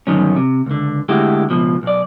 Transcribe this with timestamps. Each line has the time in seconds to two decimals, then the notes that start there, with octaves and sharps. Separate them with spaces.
0.07 D2 G2 B2 D#3 F#3 C#4
0.36 C3
0.66 C#2 D3
1.09 D3 G#3 A3 E4 F#4 G4
1.50 C#2 B2 F3
1.83 B1 D5